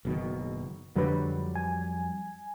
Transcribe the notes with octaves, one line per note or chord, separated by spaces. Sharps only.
F#1 B2 D#3
F2 D3 F#3 G3 B4
G#5